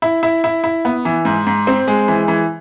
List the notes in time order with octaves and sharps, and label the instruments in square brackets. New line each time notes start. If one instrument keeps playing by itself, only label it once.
[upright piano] E4
E4
E4
E4
B3
E3
G#2
G#2
C4
G#3
E3
E3